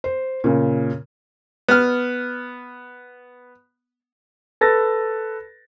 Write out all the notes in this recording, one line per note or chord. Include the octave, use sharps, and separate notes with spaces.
C5
A#2 C#3
B3 F6
A4 B4 A6 A#6